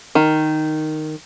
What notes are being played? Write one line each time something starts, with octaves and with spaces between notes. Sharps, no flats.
D#3